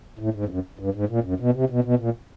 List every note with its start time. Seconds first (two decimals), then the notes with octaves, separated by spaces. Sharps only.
0.19 A2
0.34 G#2
0.45 F2
0.49 F#2
0.79 G2
0.94 G#2
1.09 A#2
1.24 F#2
1.40 B2
1.54 C3
1.70 B2
1.84 B2
1.99 A#2